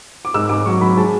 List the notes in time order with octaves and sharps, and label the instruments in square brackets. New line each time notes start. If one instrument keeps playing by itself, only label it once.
[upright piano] D6
G#2 E6
G#2 D6
F#3 C#6
F#3 B5
G#3 A5